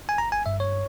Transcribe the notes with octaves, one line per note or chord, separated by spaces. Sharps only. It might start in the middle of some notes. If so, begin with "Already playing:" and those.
G#5
G1 A#5
G#5
G2 E5
C#5